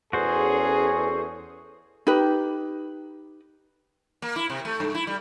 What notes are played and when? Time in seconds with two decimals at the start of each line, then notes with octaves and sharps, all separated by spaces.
0.13 E2 C#4 F#4 G#4 A4 C5
2.07 D#4 G4 B4
4.22 A#3
4.36 E4
4.50 C3
4.65 A3
4.80 G2
4.95 E4
5.07 G3